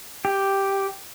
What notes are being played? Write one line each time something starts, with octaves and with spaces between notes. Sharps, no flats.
G4